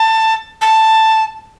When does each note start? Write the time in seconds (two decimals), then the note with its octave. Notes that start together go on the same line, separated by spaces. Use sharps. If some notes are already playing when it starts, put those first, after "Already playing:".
Already playing: A5
0.61 A5